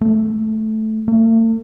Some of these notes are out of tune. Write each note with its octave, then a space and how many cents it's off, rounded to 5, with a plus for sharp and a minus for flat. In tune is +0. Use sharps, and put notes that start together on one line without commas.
A3 -10
A3 +45